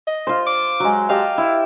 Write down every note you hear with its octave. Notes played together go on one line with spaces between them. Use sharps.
D#5
F4 C5
D6
F#3 G#3
G4 D#5 F5 A5
E4